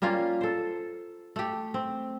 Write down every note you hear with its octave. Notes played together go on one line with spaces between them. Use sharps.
G3 A#3 C#4 F4
A4 C5
A3 G4
C4